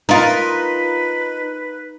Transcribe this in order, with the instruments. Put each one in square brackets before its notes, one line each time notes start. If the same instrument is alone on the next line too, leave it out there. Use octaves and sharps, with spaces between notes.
[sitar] D#4 [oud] F4 A#4 [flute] B4